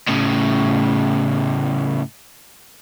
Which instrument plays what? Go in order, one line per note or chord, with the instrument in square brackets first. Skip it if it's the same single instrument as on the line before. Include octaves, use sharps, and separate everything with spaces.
[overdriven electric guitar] A2 C#3